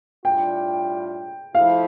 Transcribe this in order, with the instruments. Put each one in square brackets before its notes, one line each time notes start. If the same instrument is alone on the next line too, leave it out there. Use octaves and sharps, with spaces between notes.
[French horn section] A2 G3 D4 F4 [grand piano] G5
[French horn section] F3 A3 E4 [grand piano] F5